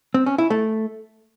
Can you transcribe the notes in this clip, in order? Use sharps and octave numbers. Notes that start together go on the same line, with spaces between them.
C4
C#4
E4
A3